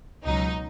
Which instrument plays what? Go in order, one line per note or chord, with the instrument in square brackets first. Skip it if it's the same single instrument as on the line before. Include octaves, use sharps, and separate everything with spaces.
[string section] C#2 B2 F#3 D#4